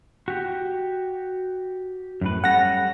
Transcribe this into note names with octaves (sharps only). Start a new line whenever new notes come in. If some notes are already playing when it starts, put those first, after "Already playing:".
F#4 G4
F#2 A2 B4
G3 C#4 A4 F#5 A#6